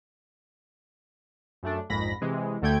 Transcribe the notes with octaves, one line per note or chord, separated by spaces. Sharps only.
F#2 A3 D4
A#1 F2 G#2 B5 A#6
C3 E3 G#3
D2 D3 A3 G5 G6 G#6